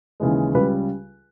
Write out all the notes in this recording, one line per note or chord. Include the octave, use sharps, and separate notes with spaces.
D#2 C#3 E3 G#3
C#2 C#3 G3 B4